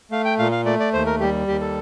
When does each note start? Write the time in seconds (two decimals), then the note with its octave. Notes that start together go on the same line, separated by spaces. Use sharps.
0.11 A3 F5
0.25 G5
0.39 A#2 F5
0.52 F5
0.65 A3 D5
0.80 D5
0.93 D#2 C5
1.06 A#4
1.20 G3 G4
1.47 D#2 G4
1.61 A4